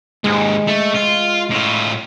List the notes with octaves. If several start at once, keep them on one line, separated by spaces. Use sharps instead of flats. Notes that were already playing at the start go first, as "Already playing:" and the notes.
D#2 G#2 G#3
A3
F4
A2 F4